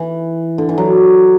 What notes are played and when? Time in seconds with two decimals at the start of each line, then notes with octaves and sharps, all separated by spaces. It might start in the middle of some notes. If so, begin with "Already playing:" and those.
Already playing: E3
0.58 D3
0.69 E3
0.78 F#3